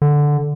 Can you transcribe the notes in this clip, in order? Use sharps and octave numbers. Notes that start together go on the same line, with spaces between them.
D3